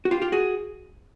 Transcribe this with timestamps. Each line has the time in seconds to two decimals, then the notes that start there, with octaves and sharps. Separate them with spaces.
0.05 F#4
0.11 F4 G4
0.22 F4 G4
0.32 F#4 G#4